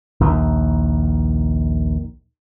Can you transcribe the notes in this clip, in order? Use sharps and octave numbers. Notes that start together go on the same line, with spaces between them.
A#1 D#2